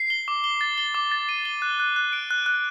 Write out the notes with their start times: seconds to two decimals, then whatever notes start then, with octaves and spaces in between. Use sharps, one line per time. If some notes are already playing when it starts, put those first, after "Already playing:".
Already playing: C7
0.10 G7
0.28 D6
0.44 G7
0.61 A6
0.78 G7
0.95 D6
1.12 A6
1.29 D#7
1.45 G7
1.62 F#6
1.80 F#6
1.96 F#6
2.13 D7
2.31 F#6
2.46 F#6